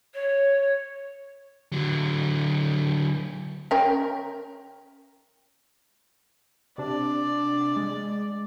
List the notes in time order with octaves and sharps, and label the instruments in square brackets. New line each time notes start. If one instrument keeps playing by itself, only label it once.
[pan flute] C#5
[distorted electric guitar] D3 F#3
[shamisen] C#4 A#4 G5
[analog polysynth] C3 D4 [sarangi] D5
[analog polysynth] G#3